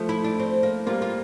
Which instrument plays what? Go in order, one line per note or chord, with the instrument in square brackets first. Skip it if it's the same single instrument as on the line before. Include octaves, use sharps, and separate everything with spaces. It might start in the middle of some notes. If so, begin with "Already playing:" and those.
Already playing: [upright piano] F3 A3
[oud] E4
D4
C4
A#3
[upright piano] G3 A#3 [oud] F4
[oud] F4